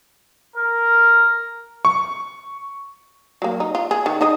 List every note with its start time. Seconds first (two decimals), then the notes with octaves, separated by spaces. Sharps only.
0.56 A#4
1.85 C#6
3.42 F#3 A#3
3.60 D#4
3.75 F4
3.91 G#4
4.06 D#3
4.21 D#4 G#4 D#5